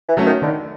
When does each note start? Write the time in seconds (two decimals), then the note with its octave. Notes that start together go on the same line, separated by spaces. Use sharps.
0.09 E3
0.17 F#3 A3 C#4
0.26 D#3
0.42 D3 D#3